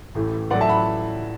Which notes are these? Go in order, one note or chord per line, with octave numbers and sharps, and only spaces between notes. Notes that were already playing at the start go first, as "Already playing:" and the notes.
A1 A2 E3 A3
A1 A2 F#3 A3 D5 F#5
E5 A5
F#5 B5